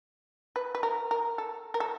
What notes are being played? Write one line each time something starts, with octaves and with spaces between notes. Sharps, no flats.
B4
B4
A#4
A#4
A4
A#4
A4